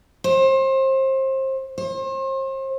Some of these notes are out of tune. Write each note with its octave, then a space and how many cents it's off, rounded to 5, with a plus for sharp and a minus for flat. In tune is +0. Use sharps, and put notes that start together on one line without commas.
C5 +30
C5 +40